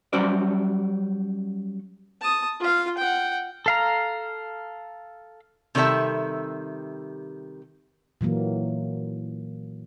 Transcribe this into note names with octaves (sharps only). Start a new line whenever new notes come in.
F#3 G3 C#4 F#4 C5 D5
A5 D#6
F4 F5
F#5 G5
A4 F5 A#5
C3 D#3 G3 C4 A4 E5
A#2 E3 F#3 A#3